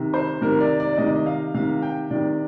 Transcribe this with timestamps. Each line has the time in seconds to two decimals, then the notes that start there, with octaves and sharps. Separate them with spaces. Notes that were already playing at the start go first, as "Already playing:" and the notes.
Already playing: C3 D#3
0.14 C5
0.42 C3 D#3 A#4
0.60 D5
0.80 D5
0.93 D5
0.98 C3 D#3 D#5
1.16 D#5
1.26 F5
1.54 C3 D#3 F5
1.82 G5
2.10 C3 D#3 D5